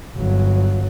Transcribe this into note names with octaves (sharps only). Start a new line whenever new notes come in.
G1 F#3